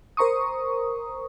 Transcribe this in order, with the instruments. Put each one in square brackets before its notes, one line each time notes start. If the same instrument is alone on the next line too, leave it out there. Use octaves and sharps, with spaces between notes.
[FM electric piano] A#4 C5 A#5 C#6 D#6